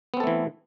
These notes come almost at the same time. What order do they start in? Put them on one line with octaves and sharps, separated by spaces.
B3 C4 A4 A3 E3